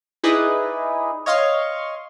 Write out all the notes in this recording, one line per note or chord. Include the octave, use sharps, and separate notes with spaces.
D#4 E4 G#4 B4 D5 D#5
C#5 D#5 F5 C6 C#6